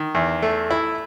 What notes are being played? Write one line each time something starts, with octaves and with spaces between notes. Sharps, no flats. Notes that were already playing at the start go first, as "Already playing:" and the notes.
Already playing: D#3
E2
A3
E4